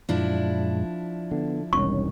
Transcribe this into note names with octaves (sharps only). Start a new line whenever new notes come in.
F#2 A#2 F3 G#3 D4 E4
D3 B3
E1 C2 D#3 G3 C#4 C#5 C#6